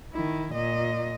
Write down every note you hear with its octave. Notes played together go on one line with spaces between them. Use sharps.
D#3 E4
A#2 D#5